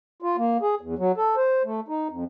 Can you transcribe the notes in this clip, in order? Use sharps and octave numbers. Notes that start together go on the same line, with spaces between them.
F4
A#3
G#4
E2
F#3
A4
C5
A3
D#4
F2